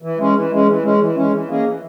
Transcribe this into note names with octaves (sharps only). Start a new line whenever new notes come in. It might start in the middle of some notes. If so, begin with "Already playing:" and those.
E3
G#3 C#4
E3
G#3 C#4
E3
G#3 C#4
E3
G#3 C#4
E3
A#3 C#4 G#4 D#5
E3